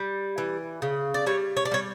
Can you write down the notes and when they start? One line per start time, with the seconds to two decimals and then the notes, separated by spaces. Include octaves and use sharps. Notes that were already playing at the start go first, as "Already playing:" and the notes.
Already playing: G3
0.38 E3
0.82 C#3
1.14 D5
1.26 G3 C#5
1.57 C#5
1.65 D5
1.71 G3 C#5